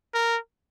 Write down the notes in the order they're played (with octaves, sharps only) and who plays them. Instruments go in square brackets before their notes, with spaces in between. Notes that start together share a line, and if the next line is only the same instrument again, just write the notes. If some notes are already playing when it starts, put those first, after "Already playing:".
[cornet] A#4